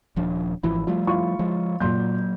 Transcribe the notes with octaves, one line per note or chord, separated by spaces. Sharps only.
D#1 F3 D4
G#1 E3 F3 E4
F3 G3 A3 F4
E4 F4 C#6
F3 G#3
A#2 F#3 A#3 C6 G6